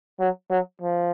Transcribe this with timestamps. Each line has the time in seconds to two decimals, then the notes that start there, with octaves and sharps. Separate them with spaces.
0.20 F#3
0.50 F#3
0.82 F3